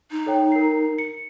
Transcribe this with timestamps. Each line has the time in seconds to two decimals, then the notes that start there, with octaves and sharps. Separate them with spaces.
0.11 D#4
0.26 A4 C#5 G5
0.52 A#4 C7
0.98 C#7